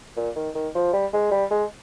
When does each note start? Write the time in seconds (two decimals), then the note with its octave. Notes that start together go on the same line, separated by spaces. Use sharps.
0.17 A#2
0.36 D#3
0.55 D#3
0.75 F3
0.93 G3
1.13 G#3
1.32 G3
1.51 G#3